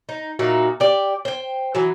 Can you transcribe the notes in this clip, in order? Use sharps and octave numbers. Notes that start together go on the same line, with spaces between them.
D#4
A#2 D#4 F#4 E5
G4 D5
C5 G5
E3 F#3